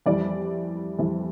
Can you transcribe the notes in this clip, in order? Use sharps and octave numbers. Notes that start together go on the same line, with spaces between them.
F2 E3 G3 D5
F2 E3 G3